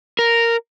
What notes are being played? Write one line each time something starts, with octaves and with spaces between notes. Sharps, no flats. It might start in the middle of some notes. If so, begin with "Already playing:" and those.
A#4